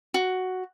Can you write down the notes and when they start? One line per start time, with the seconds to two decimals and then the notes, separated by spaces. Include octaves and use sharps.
0.14 F#4